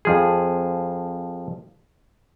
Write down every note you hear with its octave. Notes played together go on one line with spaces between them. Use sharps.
F2 F3 G#4